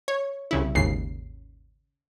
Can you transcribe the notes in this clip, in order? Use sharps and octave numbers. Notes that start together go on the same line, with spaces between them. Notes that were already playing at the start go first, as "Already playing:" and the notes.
C#5
C2 C#3 E4
G#1 D#2 C#3 C7